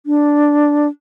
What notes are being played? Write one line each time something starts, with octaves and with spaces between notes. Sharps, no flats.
D4